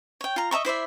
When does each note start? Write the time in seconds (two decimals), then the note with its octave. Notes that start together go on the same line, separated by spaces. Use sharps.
0.21 C#5 G5
0.36 F4 A#5
0.51 D#5 E5 A#5 C#6
0.65 E4 C5 D5 E5